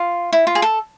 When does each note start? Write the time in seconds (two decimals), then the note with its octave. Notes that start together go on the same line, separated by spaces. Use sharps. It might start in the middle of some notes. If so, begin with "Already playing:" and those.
Already playing: F4
0.33 E4
0.47 F4
0.55 G#4
0.62 A4